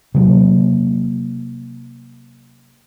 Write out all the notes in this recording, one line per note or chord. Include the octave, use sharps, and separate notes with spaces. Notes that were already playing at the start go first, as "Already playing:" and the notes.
C3 F#3 A#3